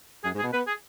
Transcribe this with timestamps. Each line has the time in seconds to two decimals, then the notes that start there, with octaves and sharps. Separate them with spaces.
0.24 F#2 G#4
0.34 G#2
0.39 G#4
0.43 B2
0.53 B3 B4
0.67 G#4